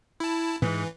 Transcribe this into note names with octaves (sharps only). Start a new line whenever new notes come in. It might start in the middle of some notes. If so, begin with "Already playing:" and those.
E4 A5
G#2 E3